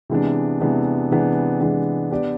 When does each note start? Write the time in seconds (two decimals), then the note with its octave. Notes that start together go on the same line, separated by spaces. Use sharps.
0.10 C3 E3 G#3 B3 D4
0.60 C3 E3 G#3 B3 D4
1.11 C3 E3 G#3 B3 D4
1.61 C3 E3 G#3 B3 D4
2.11 B3 D4 G4 B4 D5